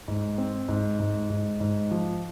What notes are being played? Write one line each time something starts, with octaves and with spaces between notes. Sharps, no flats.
G#2
C4
G#2
G#2
G#2
G#2
F3